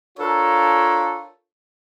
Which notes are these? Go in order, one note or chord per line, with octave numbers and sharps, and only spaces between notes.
D4 F4 A4 A#4 C#5